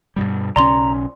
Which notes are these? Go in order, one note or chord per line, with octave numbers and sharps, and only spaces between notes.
G2 B2 G3
B1 C#3 C#4 D5 A#5 C6 F7